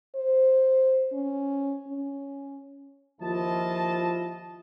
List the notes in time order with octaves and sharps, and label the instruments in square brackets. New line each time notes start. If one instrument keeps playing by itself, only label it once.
[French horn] C5
C#4
C#4
[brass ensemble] D#2 F3 E4 F4 D#5 A5